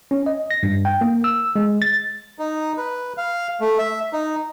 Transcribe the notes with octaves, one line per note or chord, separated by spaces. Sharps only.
C#4
D#5
A#6
G2
G5
A#3
E6
G#3
A6
D#4
B4
F5
A3
E5
D#4